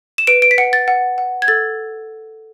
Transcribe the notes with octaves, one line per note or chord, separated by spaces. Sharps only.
E7
B4 D7
D7
B6
F#5 C#7
A6
F#5
F#5
G#6
A4 A6